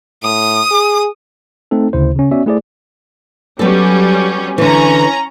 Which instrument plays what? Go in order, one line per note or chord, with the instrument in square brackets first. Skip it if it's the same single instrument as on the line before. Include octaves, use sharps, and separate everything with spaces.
[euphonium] A2 [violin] D#6
[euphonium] G#4
[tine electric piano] A3 C4 D#4 A4
D2 C#3 E4 C5
C#3 C#4
B3 C#4 F#4 D5 E5
A3 E4 G#4 C5 D5
[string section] F#3 G3 C#4 [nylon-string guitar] B3 A4
[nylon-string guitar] D3 E3 [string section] C#4 A#5